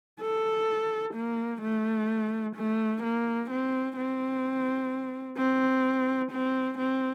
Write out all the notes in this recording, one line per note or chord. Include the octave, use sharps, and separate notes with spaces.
A4
A#3
A3
A3
A#3
C4
C4
C4
C4
C4